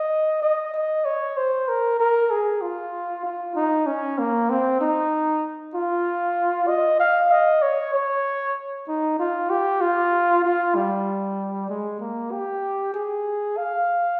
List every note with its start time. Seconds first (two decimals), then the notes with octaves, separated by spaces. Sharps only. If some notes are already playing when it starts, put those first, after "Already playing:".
Already playing: D#5
0.42 D#5
0.74 D#5
1.05 C#5
1.37 C5
1.69 A#4
2.00 A#4
2.30 G#4
2.61 F4
3.25 F4
3.55 D#4
3.86 C#4
4.19 A#3
4.50 C4
4.81 D#4
5.75 F4
6.68 D#5
7.00 F5
7.31 D#5
7.62 C#5
7.94 C#5
8.88 D#4
9.19 F4
9.50 G4
9.81 F4
10.44 F4
10.75 G3
11.69 G#3
12.00 A#3
12.32 G4
12.94 G#4
13.57 F5